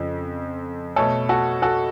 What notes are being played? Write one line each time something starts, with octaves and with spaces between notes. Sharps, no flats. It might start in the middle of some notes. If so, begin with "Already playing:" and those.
Already playing: F2 C#3 F3
B2 A3 A4 C#5
F#4 A4
F#4 A4